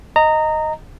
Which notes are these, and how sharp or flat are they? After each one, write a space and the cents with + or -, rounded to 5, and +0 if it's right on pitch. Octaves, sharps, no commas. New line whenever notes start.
D#5 +0 A#5 -20